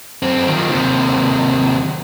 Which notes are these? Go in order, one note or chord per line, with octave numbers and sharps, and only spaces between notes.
F#2 C4
D#3 F3
D#2 C3